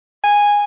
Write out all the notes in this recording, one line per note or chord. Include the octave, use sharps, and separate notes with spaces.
G#5